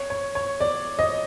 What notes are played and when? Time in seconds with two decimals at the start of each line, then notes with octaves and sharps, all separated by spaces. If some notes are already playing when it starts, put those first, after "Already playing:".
Already playing: C#5
0.10 C#5
0.35 C#5
0.60 D5
0.99 D#5